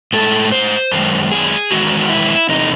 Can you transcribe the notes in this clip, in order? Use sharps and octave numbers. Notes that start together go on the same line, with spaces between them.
A2 G#3 A4
C5
F#2 D#3 G#3
G#4
E2 D#3 G#3 F#4
E4
E2 C3 E3 D#4